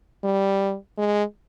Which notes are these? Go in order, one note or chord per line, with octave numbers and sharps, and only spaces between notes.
G3
G#3